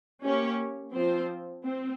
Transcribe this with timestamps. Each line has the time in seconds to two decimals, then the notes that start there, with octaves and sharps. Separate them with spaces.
0.22 A#3 C#4 G4 C#5
0.93 F3 C4 F4 C5
1.65 C4